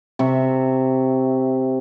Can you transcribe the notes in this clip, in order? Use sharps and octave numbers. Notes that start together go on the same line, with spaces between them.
C3 E5 C#6